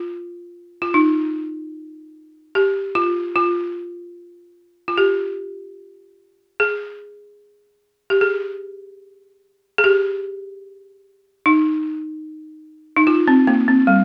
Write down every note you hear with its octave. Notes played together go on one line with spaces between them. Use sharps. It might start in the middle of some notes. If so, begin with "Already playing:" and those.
Already playing: F4
F4
D#4
G4
F4
F4
F4
G4
G#4
G4
G#4
G#4
G4
D#4
D#4
F4
C4
A#3
C4
G3